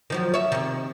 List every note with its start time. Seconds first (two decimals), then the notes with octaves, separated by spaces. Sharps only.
0.10 D#3 F3 F#3
0.34 C#5 E5
0.52 C3 D#3